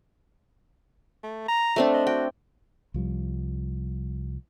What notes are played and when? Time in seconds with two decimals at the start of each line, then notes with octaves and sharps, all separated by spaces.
1.24 A3
1.48 A#5
1.76 A3 C4 D4
1.94 D#5
2.07 F#4 G5
2.94 C2 F3 G3